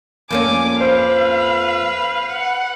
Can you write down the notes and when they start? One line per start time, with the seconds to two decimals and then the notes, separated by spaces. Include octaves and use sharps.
0.31 F2 A#3 C#4 G#5 D6
0.81 B4 C5 F5 B5
2.30 F#5